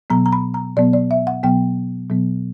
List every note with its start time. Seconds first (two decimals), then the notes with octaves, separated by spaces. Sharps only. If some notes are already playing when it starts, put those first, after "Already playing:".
0.10 B2 F#3 B3 A#5
0.26 A#5
0.32 B5
0.54 A#5
0.77 B2 F#3 B3 D5
0.93 D5
1.11 E5
1.27 F#5
1.43 B2 F#3 B3 G5
2.10 B2 F#3 B3